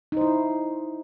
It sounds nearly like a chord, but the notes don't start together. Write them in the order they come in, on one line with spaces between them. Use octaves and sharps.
D#4 C5 E4